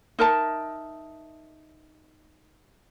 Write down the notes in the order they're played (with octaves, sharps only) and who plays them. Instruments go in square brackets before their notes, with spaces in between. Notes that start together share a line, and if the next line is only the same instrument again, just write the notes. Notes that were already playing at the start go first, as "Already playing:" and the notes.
[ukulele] D#4 A#4 E5 A5